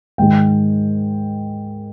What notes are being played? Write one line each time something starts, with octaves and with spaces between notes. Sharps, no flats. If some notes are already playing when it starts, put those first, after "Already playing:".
G#2 D#3 G#3 G5